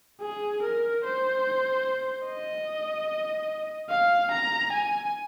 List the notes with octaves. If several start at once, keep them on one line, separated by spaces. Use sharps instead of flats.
G#4
A#4
C5
D#5
F5
A#5
G#5